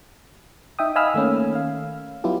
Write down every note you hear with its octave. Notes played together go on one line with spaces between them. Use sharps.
D#4 E5 G5 D#6
D#5 F5 G#5 B5 E6 F6
D#3 A3 A#3 C#4
F5
F#3 B3 E4 F4 G4